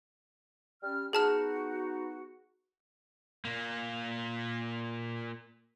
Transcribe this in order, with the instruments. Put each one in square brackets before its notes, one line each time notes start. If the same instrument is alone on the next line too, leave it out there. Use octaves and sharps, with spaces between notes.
[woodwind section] G3 C#4 F6
[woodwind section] B3 D#4 F#4 [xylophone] G#4 A5 F6
[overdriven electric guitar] A#2 A#3